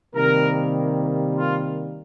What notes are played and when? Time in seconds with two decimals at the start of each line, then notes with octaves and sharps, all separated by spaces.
0.14 C3 D#3 G3 A#3 A#4
1.35 F4